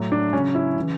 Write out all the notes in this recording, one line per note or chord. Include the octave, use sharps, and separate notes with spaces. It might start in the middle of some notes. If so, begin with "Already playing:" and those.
Already playing: A2 F#3
D4
C#3 F#3 C#4
E4
C#3 E3